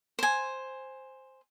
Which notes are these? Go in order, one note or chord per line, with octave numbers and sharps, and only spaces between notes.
C5 G#5